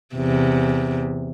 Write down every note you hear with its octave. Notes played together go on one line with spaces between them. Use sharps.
E2 C3